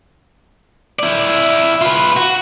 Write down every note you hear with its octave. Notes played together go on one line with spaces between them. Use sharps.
E4 D5
F4 B4
F#4